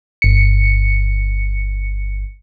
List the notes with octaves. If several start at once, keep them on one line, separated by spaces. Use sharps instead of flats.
G1 C#7